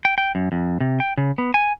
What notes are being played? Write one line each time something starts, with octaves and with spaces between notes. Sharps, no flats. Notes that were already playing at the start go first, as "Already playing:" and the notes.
G5
G5
F#2
F2
C3
G5
C#3
B3
G#5